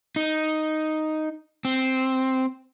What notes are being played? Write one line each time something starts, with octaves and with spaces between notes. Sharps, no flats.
D#4
C4